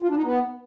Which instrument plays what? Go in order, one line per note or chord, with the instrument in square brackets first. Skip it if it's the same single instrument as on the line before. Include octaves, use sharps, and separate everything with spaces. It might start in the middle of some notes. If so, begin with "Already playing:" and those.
[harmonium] F4
D4
D#4
B3